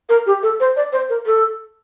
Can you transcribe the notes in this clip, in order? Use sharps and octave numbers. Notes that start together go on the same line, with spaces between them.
A#4
G4
A4
C5
D5
C5
A#4
A4